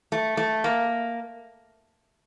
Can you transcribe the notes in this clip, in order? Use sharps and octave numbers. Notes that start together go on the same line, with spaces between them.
A3
A3
A#3